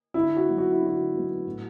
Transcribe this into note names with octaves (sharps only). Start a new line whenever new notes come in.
D3 E4
F#4
F#3 B3
F#4
E4
D3
F#4
F#3 B3
A2